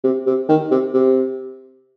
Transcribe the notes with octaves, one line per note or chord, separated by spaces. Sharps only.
C3
C3
D#3
C3
C3